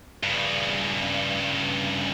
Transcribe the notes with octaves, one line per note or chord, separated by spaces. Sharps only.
G2 C#3